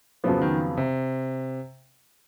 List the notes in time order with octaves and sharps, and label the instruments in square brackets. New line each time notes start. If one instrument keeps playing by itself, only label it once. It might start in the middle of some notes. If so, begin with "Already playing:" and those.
[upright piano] F2 C#3 F#3 B3 [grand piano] F3
[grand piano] D#3
C3